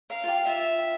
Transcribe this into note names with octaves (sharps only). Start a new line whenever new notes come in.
A#4 F5
F4
G4
F4 E5